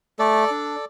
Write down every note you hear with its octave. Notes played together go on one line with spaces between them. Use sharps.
A3 A4 D5
D4